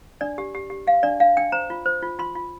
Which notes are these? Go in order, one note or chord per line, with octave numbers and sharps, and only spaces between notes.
D4 D5
G4
G4
G4
G4 F5
D4 D5
D4 F5
D4 G5
C5 A#5
F4
C5
F4
F4 C6
F4